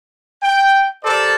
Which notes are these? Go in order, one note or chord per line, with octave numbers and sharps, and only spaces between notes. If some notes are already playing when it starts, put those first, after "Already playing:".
G5
G4 A4 A#4 C5 D5 A5